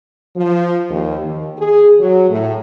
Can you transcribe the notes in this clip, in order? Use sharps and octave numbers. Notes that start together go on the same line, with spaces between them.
F3
D#2
D#2
G#4
F#3
A2